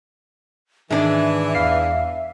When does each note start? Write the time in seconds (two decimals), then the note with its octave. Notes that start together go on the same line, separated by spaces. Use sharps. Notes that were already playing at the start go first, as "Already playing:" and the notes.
0.91 G#2 D#3 E3 G#3 D4 E5
1.55 E2 F5 C7